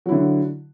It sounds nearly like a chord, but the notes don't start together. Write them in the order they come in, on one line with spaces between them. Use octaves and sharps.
F#3 E4 D3